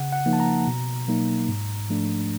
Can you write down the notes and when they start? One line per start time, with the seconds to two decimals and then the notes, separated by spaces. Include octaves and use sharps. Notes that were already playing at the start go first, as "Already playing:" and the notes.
Already playing: C#3 F#5
0.12 F#5
0.26 F3 A#3 D#4
0.33 A5
0.40 A#5
0.67 B2
1.08 F#3 A#3 D#4
1.48 G#2
1.90 F3 A3 D4